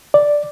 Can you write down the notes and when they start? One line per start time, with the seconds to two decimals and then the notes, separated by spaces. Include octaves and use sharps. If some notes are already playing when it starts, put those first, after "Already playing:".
0.14 D5